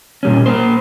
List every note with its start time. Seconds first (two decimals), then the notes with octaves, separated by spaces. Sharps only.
0.23 A#2 G3 C#4
0.46 A#3 C5